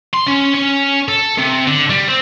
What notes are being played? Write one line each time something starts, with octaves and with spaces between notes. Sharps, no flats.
C6
C#4
C#4
A4
C3
D3
G3
C4